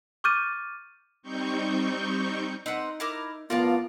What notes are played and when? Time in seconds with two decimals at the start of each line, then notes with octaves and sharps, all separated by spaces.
0.24 C#6 D6 F6 G6 A6 D#7
1.23 G3 C4 D#4 C#6 G6
2.66 C4 D#4 B4 F#5
3.00 E4 A#4 D6
3.50 A2 F3 B3 F4 A#4 D5 F5 A5